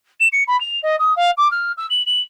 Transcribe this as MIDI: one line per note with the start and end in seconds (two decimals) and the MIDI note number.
0.20 0.27 100
0.32 0.43 97
0.47 0.59 83
0.60 0.79 101
0.83 0.96 75
0.99 1.15 87
1.16 1.31 77
1.37 1.50 86
1.51 1.72 89
1.77 1.87 88
1.90 2.05 102
2.06 2.20 102